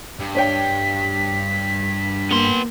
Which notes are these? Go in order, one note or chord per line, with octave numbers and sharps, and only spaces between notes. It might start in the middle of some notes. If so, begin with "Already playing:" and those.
G2
D4 C#5 G5 B6
A#3 B3 C6